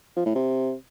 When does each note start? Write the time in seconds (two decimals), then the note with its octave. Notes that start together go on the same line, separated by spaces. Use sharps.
0.17 F3
0.26 A2
0.35 C3